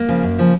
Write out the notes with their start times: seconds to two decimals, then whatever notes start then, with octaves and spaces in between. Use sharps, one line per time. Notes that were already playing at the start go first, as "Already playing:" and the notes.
Already playing: A#3
0.08 C#3 F3
0.23 F#2
0.38 C#3 F3